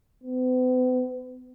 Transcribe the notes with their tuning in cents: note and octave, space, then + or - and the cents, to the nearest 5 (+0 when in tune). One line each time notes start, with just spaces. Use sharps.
B3 +45